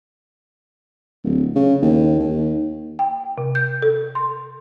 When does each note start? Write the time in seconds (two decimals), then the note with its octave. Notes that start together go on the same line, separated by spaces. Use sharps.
1.24 D1
1.56 C#3
1.82 D#2
2.19 D#2
2.99 G5
3.38 C3
3.55 G6
3.82 A4
4.15 C6